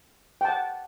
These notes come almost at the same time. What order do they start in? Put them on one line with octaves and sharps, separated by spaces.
G5 A5 F#5